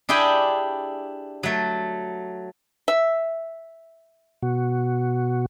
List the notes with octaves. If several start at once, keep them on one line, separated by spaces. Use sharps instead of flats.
D4 E4 G4 G#4 G5 G#5
F#3 A3
E5
B2 F#4